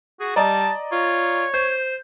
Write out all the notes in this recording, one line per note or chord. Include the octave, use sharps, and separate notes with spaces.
F#4 G#4
G3 D5 D#5 A5 A#5
F4 C#5
C5 G6